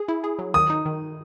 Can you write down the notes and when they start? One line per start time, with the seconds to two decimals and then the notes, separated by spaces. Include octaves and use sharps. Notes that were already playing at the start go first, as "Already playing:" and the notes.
Already playing: G#4
0.08 E4
0.24 G#4
0.39 F#3
0.54 D#3 D#6
0.70 D#4
0.86 D#3